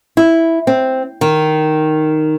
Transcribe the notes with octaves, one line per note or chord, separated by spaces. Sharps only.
E4
C4
D#3